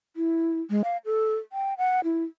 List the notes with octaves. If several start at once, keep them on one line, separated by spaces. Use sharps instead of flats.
E4
G#3
F5
A4
G5
F#5
E4